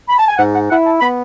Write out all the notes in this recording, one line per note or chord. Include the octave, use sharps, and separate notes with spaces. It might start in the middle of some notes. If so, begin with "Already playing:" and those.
B5
A5
G#5
G#2 F#5
F#5
E4 F#5
A5
B3 B5